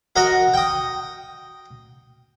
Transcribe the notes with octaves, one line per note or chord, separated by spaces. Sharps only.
F#4 A#4 D#5
G5 D#6